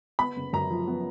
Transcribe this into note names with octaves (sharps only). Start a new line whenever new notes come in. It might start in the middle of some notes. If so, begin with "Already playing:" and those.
B3 B5
F#1
F#2 A#5
F3
B3